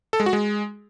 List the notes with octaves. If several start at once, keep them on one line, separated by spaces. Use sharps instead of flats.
A4
G#3
F#4
G#3